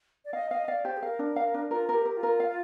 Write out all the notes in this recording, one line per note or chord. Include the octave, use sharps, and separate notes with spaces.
D5
D#5 F5
D#5 F5
D5 F5
G4 C5
G#4
A#4 F5
D4
F5
D4
F4 A#4
A#4
G4
A#4
F4
A#4
F5